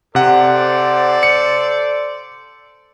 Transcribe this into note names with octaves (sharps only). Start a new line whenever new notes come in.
C3 A4 C5 D5 F#5
C#7